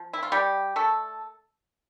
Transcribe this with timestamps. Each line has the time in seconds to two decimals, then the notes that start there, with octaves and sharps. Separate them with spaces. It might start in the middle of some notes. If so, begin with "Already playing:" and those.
Already playing: F3
0.13 E4
0.23 F4
0.32 G3 G4
0.76 A3 A4